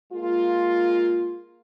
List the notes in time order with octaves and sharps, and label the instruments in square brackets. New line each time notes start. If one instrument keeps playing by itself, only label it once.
[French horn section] G#3 A#3 F4